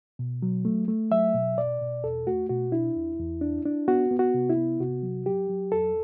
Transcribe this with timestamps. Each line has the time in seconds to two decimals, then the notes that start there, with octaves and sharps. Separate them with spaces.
0.19 B2
0.42 F#3
0.65 A3
0.88 A3
1.11 F#3 E5
1.34 B2
1.58 B2 D5
1.81 B2
2.04 E2 A4
2.27 A3 F#4
2.49 B2 F#4
2.72 D4 E4
2.96 E2
3.19 E2
3.41 D4
3.65 D4
3.88 B3 F#4
4.11 B3
4.19 F#4
4.34 C3
4.50 E4
4.57 B3
4.80 C3 F#4
5.03 F#3
5.26 F#3 G4
5.49 F#3
5.72 E2 A4